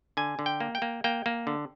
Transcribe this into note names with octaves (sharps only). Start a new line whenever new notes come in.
D3 G#5
D3
G5
A#3
G5
A#3
A#3 G5
A#3
D3